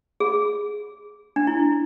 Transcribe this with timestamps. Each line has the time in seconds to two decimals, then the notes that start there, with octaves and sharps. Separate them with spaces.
0.20 G#4
1.36 D4
1.47 E4